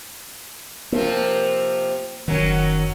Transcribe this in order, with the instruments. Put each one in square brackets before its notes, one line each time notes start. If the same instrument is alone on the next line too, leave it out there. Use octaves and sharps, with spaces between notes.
[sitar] C3 F3 C4 [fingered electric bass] A#3
[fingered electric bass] F#1 D#3 [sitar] F#3 C#4